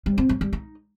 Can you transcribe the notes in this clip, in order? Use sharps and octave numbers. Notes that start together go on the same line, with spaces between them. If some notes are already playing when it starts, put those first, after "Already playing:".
G3
C4
F#3
G3
D#4